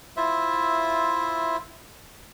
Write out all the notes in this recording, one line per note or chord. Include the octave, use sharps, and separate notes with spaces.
E4 F4 C5 E5